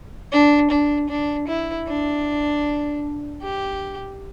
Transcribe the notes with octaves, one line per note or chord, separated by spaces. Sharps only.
D4
D4
D4
E4
D4
G4